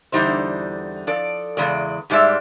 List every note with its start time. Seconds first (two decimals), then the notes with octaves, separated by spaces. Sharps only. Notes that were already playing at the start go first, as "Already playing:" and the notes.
0.12 E2 D3 G3 D#4 C5
1.07 F3 A4 D5
1.57 E2 C#3 G#3 D5
2.10 G#2 G3 G#3 D#4 D5 E5